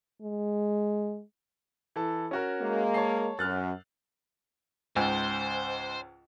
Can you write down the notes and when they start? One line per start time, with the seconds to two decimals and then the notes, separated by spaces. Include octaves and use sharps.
0.22 G#3
1.96 E3 A4 A5
2.31 C#4 F#4 A#4
2.62 G#3 A#3
2.94 C#5 A5 C7
3.39 F#2 F6 F#6 A6
4.96 C#2 G#2 C5